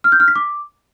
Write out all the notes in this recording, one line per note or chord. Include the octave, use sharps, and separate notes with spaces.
F6
G6
F6
B6
D6